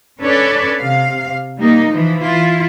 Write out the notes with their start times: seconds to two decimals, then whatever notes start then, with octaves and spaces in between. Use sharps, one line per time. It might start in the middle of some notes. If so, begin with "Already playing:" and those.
0.23 C#4 D4 A4 B4 C#5 D5
0.81 C3 F5
1.59 G3 A#3 D#4
1.89 E3 F3
2.24 E4 F4